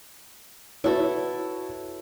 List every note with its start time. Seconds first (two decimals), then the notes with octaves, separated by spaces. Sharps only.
0.84 E4 F#4 A4 B4 C#5